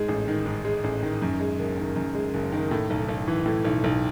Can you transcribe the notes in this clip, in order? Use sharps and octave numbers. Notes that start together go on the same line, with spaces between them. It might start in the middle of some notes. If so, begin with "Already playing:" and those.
Already playing: G#2 G#3
A1
D#3
G#2
G#3
A1
D#3
F#2
G#3
F#1
D#3
F#2
G#3
F#1
D#3
A2
B1
B1
E3
A2
B1
B1